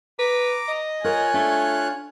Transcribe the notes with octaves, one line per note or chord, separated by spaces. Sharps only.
B4 A#5 D6
D#5
F4 A#4 C#5 G#5 F#6
A3 D4